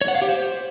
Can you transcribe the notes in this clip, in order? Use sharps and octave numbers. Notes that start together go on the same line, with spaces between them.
C#5
F#5
F5
G4
C5